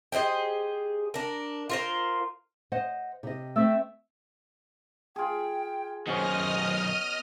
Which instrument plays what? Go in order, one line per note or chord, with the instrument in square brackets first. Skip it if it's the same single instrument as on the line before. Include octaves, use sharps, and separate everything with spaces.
[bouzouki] G4 G#4 C5 D#5
D4 A#4
F4 A#4 C5
[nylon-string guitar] C5 D#5 F#5
C3 D#5
[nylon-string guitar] A3 C4 [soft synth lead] E5
[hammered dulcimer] F4 G#4 [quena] G5
[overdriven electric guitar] F#2 D#3 [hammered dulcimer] B2 C#4 [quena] C5 [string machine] D#5 D#6 F6